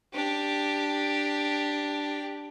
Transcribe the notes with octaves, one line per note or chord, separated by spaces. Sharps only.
D4 G4